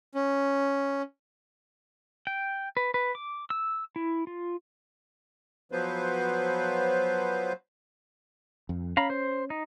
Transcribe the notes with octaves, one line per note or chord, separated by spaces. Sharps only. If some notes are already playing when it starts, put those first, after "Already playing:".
C#4
G5
B4
B4
D6
E6
E4
F4
F3 F#3 B3 B4 C5
F2
C#4 F5 A#5 B5
C5
D#4